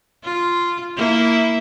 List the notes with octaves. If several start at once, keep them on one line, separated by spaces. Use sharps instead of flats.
F4
A#3 E4